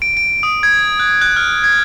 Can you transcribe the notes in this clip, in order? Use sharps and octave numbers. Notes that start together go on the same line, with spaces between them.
D7
D7
D#6
G#6
F#6
F#6
F6
G#6